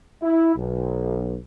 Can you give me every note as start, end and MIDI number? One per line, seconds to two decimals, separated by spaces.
0.23 0.53 64
0.57 1.37 35